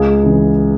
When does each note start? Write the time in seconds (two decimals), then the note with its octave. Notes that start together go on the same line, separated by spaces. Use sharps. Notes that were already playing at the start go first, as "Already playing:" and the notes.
Already playing: C#2 G#4
0.23 C#3 E3